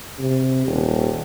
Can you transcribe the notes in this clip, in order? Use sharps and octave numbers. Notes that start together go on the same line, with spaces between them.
C3
D#1